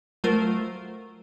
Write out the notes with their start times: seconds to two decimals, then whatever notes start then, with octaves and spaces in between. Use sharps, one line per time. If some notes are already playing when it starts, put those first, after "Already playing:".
0.24 F#3 A3 F4 A#4 C5